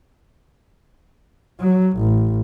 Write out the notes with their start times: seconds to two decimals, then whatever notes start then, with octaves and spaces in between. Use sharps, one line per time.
1.61 F#3
1.98 A1